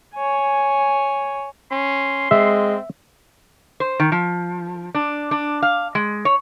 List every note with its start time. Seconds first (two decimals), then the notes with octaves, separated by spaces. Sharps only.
0.15 C#5 G#5
1.71 C#4 C6
2.31 G#3 C4 E5
3.80 C5
4.00 D#3
4.12 F3
4.95 D4
5.31 D4
5.62 F5
5.95 G#3
6.25 C#5